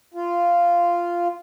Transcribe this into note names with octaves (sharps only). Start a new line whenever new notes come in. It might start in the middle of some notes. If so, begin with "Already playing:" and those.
F4